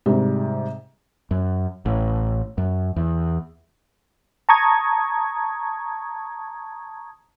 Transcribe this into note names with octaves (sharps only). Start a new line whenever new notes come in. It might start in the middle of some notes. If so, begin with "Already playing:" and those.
G#2 C3 G3
F#2
A1
F#2
E2
A5 A#5 C#6 D#6 G#6